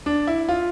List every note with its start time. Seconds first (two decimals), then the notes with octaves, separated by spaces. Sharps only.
0.06 D4
0.27 E4
0.49 F4